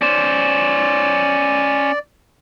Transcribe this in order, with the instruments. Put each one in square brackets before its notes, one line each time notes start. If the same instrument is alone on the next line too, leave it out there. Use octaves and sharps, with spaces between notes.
[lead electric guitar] C#4 C5 [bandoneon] D5